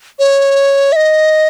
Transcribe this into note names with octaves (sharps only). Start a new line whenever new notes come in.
C#5
E5
D#5